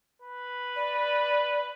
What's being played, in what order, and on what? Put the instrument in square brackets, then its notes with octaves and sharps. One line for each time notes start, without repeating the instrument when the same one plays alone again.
[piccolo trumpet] B4
[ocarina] D5